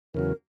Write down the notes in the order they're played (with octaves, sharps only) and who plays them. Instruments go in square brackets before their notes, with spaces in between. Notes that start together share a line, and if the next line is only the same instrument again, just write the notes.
[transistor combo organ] E2 C#3 F#3 [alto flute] A#4